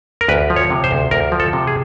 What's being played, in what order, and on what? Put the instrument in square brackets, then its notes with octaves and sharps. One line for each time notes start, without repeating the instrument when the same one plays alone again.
[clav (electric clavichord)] A#4
D2 B4
F3
C#5
C3
C5
D2
D2 A#4
F3
A4
C3
G#4